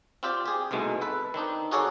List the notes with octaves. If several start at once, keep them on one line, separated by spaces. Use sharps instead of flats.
C4 F4 G4 D5
G4 G#4
C2 G#2 B2 G#3 A3
A4 B4
D#3 C4 D4 D#4
D#4 F#4 G#4 A4 C#5 D5